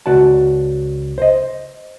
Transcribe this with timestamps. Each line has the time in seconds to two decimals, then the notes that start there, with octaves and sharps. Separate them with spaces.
0.06 C#2 F#4 D5 A5
1.18 C5 D#5